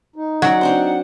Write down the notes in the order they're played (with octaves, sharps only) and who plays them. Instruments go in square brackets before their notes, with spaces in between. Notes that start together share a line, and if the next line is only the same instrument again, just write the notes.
[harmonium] D#4
[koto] F#3 [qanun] C#4 D5 [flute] F#5
[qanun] C4 D4 C5